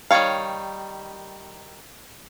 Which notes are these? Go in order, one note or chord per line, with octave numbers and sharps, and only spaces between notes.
D#3 G3 A3 C#5 F5